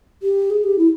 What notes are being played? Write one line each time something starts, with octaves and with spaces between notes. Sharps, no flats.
G4
G#4
G4
E4